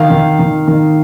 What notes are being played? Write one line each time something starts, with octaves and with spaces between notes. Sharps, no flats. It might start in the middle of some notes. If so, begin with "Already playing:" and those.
Already playing: D#3 F5
D#3
D#3
D#3